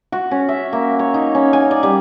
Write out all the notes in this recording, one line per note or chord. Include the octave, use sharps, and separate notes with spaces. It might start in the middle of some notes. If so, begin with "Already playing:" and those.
F#4
C#4
E5
A#3
C#5
D#4
C#4
G#5
D5
G3